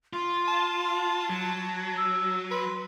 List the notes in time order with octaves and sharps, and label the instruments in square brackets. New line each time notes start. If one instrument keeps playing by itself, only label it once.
[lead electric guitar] F4 [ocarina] C6
[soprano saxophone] A5
[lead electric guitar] F#3
[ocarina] E6
[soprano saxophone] B4 [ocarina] C6